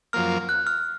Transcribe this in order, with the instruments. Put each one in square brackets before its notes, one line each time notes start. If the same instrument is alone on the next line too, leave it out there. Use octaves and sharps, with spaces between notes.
[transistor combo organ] F#2 F3 A#3 [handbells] F6
[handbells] F#6
F6